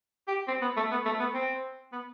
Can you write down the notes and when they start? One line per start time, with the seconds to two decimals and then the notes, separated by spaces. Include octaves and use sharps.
0.28 G4
0.47 C4
0.62 B3
0.77 A3
0.91 B3
1.06 A3
1.20 B3
1.34 C4
1.92 B3